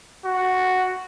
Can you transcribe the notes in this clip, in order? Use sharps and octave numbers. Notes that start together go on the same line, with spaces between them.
F#4